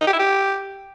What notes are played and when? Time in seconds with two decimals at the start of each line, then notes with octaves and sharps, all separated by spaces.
0.01 D#4
0.07 G4
0.13 E4
0.19 G4